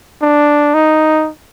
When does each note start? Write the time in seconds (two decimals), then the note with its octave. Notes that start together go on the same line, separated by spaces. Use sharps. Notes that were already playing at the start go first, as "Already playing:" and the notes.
0.22 D4
0.74 D#4